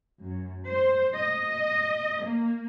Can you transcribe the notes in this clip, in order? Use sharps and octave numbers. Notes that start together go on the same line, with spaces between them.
F#2
C5
D#5
A#3